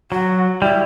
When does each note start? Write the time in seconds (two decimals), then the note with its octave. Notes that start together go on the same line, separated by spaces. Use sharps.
0.11 F#3 F#4
0.62 G3 E4